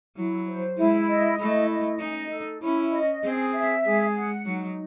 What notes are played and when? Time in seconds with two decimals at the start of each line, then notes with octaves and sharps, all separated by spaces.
0.17 F#3 E4
0.47 C5
0.77 G#3 E4
1.09 D#5
1.38 A3 E4
1.70 D#5
2.00 C#4 D#4
2.31 A4
2.61 C#4 E4
2.92 D#5
3.23 C4 G#4
3.53 E5
3.85 G#3 G#4
4.15 F#5
4.45 F#3 D#4